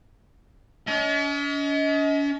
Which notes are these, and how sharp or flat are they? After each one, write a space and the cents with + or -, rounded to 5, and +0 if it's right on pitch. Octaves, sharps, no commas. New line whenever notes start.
C#4 +45 D#5 +30